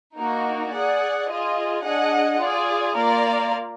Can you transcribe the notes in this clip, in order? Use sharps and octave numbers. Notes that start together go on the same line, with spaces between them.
A#3 D#4 F#4 A#4
G#4 D5 F#5
F4 G#4 D#5
D4 G#4 D#5 F#5
F4 G#4 D5
A#3 F4 A#4 D5 F5